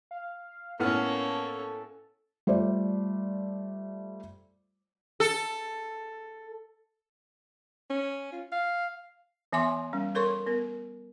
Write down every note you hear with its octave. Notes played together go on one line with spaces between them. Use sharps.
F5
A2 A#3 B3 C#4 A4 F6
G3 A3 F4 C5 D5
A4
C#4
F4
F5
E3 B3 E5 G#5 C6 D6
G3 C#4
A4 A#4 C#5 C6 C#6
B3 A#4